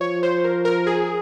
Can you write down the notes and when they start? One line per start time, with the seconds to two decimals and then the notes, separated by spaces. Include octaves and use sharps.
0.01 F3 C#5
0.23 C5
0.44 A#4
0.65 A#4
0.87 G#4